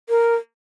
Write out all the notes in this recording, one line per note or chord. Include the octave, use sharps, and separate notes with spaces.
A#4